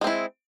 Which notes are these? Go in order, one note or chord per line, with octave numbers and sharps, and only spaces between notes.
G#3 C4 E4